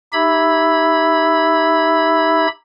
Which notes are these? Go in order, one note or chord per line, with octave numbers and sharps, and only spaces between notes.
D#4 G4 E5 B5 E6 G#6